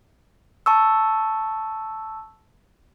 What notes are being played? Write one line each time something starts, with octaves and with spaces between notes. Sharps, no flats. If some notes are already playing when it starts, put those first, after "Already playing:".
A5 C#6 E6